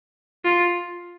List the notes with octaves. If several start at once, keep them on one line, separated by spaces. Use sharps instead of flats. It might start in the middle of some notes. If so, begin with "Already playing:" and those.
F4